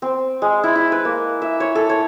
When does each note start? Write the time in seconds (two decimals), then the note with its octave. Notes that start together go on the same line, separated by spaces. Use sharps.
0.02 C4
0.42 G#3
0.64 E4
0.75 E4
0.92 B4
1.05 A#3
1.42 E5
1.60 C#5
1.75 A4
1.89 C#5